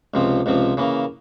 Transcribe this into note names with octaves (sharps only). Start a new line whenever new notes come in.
C#2 C3 F3 C4
C#2 C3 F3 C4
C#3 E3 A#3